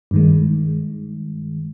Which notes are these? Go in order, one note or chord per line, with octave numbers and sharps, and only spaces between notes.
G2 D#3 G#3